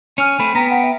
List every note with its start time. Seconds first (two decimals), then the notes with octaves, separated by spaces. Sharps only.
0.18 C#4 G#5 F6 F7
0.39 A3 C4 B5
0.55 B3 G5 A#5 A#6 B6
0.71 F#5 B6
0.83 E5